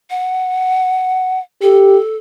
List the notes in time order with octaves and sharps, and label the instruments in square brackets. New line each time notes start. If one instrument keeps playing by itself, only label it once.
[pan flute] F#5
[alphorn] G4 [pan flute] A4